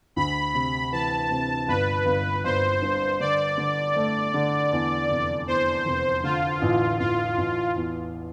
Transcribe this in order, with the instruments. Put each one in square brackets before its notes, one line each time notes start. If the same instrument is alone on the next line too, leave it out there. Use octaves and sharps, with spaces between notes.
[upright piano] D2 [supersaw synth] B5
[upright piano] C3
[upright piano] E3 [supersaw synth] A5
[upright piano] C3
[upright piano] G1 [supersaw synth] B4
[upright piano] G1
[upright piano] G1 [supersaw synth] C5
[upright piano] G2
[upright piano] D3 [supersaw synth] D5
[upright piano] D3
A3
D3
E2
F1
[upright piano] E2 [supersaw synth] C5
[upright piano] F1
[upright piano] D3 [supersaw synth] F4
[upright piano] A1
[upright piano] A1 [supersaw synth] F4
[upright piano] A1
E2